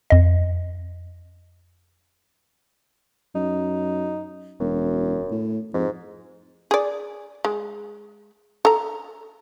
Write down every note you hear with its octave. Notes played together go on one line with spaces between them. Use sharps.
F2 D#5
F#2 D#4
E1 F#2
A2
F2 G#2
G#4 D5
G#3
A4 A#5